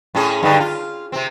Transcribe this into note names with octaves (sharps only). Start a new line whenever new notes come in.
A2 C#4 G#4
G2 D3 D#4
F4
C3 C4